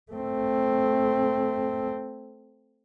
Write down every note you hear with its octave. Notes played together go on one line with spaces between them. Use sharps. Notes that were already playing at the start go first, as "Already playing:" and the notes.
A3 C4